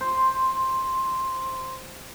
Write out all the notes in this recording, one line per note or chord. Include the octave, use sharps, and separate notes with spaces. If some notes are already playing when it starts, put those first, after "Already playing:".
C5 C6